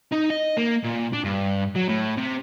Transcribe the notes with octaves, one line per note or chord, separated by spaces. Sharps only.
D#4
D#5
A#3
A#2
D4
G2
F#3
A2
C3